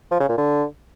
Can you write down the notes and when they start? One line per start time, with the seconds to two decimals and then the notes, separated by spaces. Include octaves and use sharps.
0.11 F3
0.20 C#3
0.29 A#2
0.38 D3